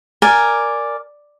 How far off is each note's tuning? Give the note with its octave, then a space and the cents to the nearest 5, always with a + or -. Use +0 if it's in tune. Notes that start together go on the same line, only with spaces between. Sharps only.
A#4 +0 D5 +0 G#5 +0